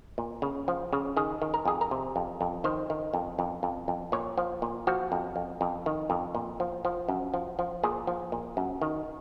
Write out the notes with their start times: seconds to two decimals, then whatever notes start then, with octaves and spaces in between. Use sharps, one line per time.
0.18 A#2
0.42 C#3
0.68 F3
0.93 C#3
1.17 D#3 G#4
1.42 D#3
1.54 A#4
1.65 F2 G#4
1.81 A#4
1.91 C3
2.16 F2
2.41 F2
2.64 D#3 C5
2.90 D#3
3.13 F2
3.39 F2
3.63 F2
3.88 F2
4.12 A#2 C#5
4.38 F3
4.62 A#2
4.87 F3 F#4
5.12 F2
5.36 F2
5.61 F2
5.86 D#3
6.10 F2
6.35 A#2
6.60 F3
6.85 F3
7.08 F#2
7.34 F3
7.59 F3
7.83 A#2 G#4
8.07 F3
8.32 A#2
8.57 F#2
8.82 D#3